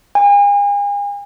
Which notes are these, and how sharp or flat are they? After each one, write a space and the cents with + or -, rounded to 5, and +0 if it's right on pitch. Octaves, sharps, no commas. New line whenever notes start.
G#5 -40